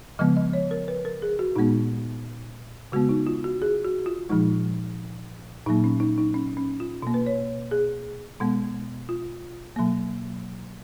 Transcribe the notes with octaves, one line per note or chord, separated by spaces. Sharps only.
C#3 F3 G#3 B3 D#5
D#5
C#5
A#4
B4
A#4
G#4
F#4
A#2 G#3 B3 D#4
C#3 G#3 B3 F#4
D#4
F4
F#4
G#4
F#4
F4
A#2 F3 G#3 D#4
A#2 F#3 A#3 D#4
C#4
D#4
D#4
C#4
C#4
F4
B2 A#3
B4
C#5
G#4
B2 G#3 B3
F4
B2 F#3 A#3